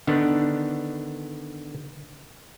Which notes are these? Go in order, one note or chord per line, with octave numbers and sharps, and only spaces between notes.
D3 D#3 B3 D4